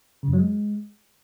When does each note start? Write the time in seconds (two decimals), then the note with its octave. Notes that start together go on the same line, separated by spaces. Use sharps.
0.23 C#3
0.28 F#2
0.33 F#3
0.38 G#3